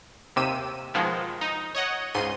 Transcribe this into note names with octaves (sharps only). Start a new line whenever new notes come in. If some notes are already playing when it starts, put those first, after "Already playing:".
D#2 C3 G4 E6 D#7
B2 D#3 F3 G#3
D#4
C#5 D#5 F#5
C#2 G#2 C6 D#7